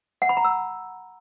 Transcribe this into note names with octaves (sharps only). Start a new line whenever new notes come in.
F#5
B5
A#5
E6